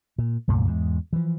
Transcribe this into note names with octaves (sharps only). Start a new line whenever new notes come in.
A#2
C2 F#2 A#2 A3
E2 G#2 G#3
E3 F3